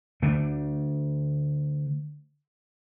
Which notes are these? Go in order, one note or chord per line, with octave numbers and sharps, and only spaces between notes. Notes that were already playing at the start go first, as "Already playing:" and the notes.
D3 A3 D4